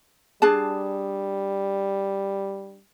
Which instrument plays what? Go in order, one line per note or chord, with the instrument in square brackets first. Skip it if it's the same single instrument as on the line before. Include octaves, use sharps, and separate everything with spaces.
[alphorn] G3 [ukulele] D4 G#4 A5